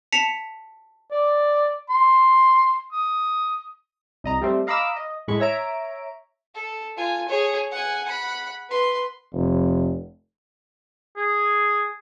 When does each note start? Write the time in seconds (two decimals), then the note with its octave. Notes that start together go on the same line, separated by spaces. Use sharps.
0.12 A5 B6 C#7 F7
1.11 D5
1.89 C6
2.92 D#6
4.24 C2 D#5 A#5
4.41 G3 A3 C4
4.67 D#5 F5 A#5 B5 D6 E6
4.96 D#5
5.28 A2 G#3 B5 C#6
5.40 C#5 E5 A#5 D7
6.54 A4
6.97 F4 G#5
7.29 G#4 C#5
7.71 F#5 G#5
8.05 F#5 B5
8.69 B4 C6
9.33 F1
11.17 G#4